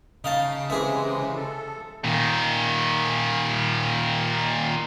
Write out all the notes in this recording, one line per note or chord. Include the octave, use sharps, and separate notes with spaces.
C#3 D#4 F5 A5
C3 E3 G#3 G#4 E5
A4
A#2 D#3